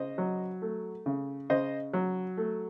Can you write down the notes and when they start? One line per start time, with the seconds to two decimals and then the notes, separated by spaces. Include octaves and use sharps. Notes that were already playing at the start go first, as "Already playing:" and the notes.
Already playing: C#3 C5 D#5
0.18 F#3
0.62 A3
1.06 C#3
1.50 C#3 C5 D#5
1.93 F#3
2.37 A3